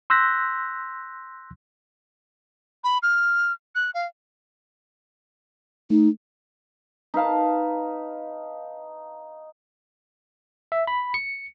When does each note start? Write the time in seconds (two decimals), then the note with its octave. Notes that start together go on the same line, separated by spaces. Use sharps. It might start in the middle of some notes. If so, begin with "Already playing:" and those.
0.10 C6 E6 F#6 G6 A#6 B6
2.84 B5
3.03 F6
3.75 F#6
3.94 F5
5.90 A3 D#4
7.14 D#4 B4 F5 A5
10.72 E5
10.87 B5
11.14 C#7